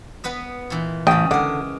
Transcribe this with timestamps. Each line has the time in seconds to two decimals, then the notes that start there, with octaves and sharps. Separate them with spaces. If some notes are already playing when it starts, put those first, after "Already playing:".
0.24 B3 B4 D#5
0.70 A#2 E3
1.07 A1 C#3 G3 G5 D#6
1.31 D3 G#3 A#4 F#5 D6